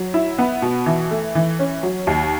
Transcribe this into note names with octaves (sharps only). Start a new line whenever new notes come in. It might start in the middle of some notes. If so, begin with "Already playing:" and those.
Already playing: F#3
E4
B3
B2
E3
A3
E3
C#4
F#3
D#2